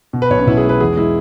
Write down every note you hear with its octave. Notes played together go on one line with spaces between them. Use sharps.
B2
B4
B1 C#5
C#4
B1 E4
G#4
G#3 B4
E2 G#4
G#3 E4